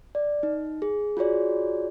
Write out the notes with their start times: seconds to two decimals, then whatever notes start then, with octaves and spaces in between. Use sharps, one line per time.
0.15 D5
0.43 D#4
0.82 G#4
1.17 F4 F#4 G#4 C#5 D5